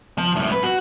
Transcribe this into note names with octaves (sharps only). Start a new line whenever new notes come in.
F3 A5
F#2 A2
B4
F#4